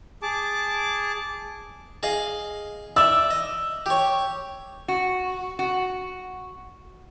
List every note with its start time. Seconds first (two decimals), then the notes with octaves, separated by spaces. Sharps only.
0.22 G#4 A5 D6
2.03 G#4 D#5 F5
2.96 D5 E5 E6
3.31 D#5
3.86 G4 C#5
4.88 F#4
5.59 F#4